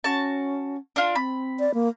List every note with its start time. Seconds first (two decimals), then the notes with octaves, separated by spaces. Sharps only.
0.04 C#4 F#4 A5
0.96 D4 F4
1.15 C4 B5
1.59 D5
1.74 A#3